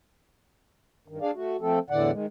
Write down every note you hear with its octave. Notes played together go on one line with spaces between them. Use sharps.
G2 D#3
D4 G#4 D5 F5
A3 F#4
F3 A3 C4 A4
E2 A2 D3 E3 D5 F#5
D#3 G#3